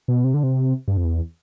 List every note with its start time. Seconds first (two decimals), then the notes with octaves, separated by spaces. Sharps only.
0.08 B2
0.24 C3
0.34 D3
0.43 C3
0.88 G2
0.97 F2
1.04 E2